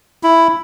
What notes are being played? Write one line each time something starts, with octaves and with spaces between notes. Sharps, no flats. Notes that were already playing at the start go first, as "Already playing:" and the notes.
E4